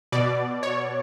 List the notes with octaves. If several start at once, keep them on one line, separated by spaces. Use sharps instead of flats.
B2 D5
C#5